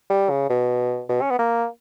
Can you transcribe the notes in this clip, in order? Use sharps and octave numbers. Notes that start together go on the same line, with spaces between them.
G3
C#3
B2
B2
C#4
B3
A#3